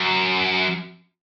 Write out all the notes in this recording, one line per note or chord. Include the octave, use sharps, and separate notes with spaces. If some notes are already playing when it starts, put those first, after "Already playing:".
Already playing: F#2